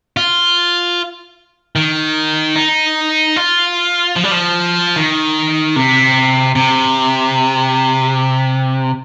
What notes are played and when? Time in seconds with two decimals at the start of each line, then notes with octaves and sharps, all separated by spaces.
0.17 F4
1.76 D#3
2.56 D#4
3.36 F4
4.16 F3
4.24 G3
4.31 F3
4.96 D#3
5.76 C3
6.55 C3